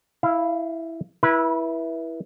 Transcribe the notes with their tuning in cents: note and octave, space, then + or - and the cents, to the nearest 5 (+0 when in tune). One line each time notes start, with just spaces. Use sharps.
E4 +0 F5 -25
E4 +0 B4 -30